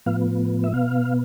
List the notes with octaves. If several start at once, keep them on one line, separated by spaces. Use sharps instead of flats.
A2 F3 B3 F5
E5
B2 B3 F5